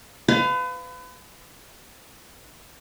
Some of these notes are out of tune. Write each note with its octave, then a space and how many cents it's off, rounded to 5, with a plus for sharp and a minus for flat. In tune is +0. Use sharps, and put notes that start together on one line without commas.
B4 +35 F5 +0